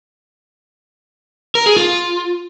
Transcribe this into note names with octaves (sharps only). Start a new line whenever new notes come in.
A#4
G#4
F4